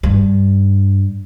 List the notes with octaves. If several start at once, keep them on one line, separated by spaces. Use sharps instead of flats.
G2